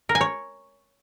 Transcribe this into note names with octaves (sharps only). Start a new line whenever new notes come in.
A#4
G#5
C#5